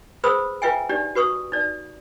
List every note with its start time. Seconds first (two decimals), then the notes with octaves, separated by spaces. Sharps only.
0.24 G#4 B4 C5 B5 D#6 E6
0.62 F4 B4 E5 G5 G#5
0.89 D4 D#4 G4 D5
1.15 F#4 B4 C#6 D#6
1.52 D#4 D5